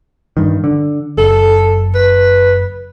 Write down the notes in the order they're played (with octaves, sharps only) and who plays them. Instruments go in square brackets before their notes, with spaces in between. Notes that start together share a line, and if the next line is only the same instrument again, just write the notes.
[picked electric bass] G2 D#3
D3
[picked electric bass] F#1 [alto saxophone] A4
[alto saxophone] B4